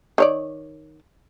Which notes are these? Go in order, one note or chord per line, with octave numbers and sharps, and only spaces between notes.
D#3 C#5 D5